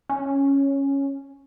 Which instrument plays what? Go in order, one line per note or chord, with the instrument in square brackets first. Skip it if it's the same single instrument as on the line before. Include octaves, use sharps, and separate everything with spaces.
[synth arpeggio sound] C#4